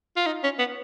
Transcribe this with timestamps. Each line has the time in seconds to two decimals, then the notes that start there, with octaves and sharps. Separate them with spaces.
0.16 F4
0.26 D#4
0.43 C#4
0.59 B3